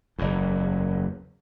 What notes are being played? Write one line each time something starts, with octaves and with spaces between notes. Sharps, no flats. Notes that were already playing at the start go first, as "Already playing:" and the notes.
F#1 E2